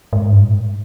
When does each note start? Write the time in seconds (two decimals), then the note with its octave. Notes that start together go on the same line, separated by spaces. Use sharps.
0.13 G#2
0.31 G2
0.42 A2
0.51 G#2